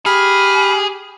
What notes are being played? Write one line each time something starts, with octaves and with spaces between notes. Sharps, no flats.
G4 G#4 B5 F6